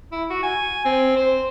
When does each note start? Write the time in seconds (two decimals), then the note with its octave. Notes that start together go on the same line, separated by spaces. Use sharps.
0.12 E4
0.30 F#4
0.43 G#5
0.86 C4
1.16 C5